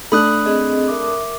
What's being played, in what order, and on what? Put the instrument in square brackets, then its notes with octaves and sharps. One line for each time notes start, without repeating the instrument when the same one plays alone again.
[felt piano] A3 D4 [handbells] B5 D#6 F#6
[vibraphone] C4 G#4 D#5
A#4 E5 D6